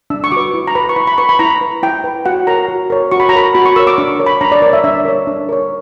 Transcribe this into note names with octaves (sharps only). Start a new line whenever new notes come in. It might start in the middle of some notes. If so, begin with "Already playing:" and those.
D4 E6
C#6
F#4 B4 D6
E4
A#5
B4 B5
C#6
E4 B5
B5
B4 C#6
B5
E4 A#5
B4
E4 G5
B4
F#4 F#5
A#4 C#5 A#5
F#4
A#4 C#5
F#4 C#6
B5
A#5
A#4 C#5 B5
F#4 B5
C#6
A#4 C#5 E6
D6
D4 C#6
A#4 C#5
B5
D4 A#5
D5
A#4 C#5 D5
E5
D4 E5
A#4 C#5
D4
A#4 C#5